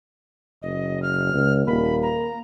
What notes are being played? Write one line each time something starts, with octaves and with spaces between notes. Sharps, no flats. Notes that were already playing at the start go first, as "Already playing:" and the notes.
F#1 D#5
F6
C#2
D#1 A#3 B5
A#5